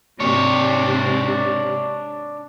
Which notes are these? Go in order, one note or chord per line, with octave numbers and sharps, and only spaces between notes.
G#2 C3 D4 C#5